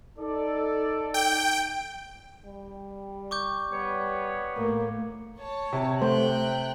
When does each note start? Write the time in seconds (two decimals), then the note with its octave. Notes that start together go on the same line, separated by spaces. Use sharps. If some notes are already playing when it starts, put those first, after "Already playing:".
0.19 D#4 A4 D5
1.14 G5
2.45 G3
3.31 C#6 D6 G6
3.71 G3 B3 C#5
4.57 A2 A#3
5.39 C#5 A5
5.73 C3
6.02 A3 C5 G5 F#6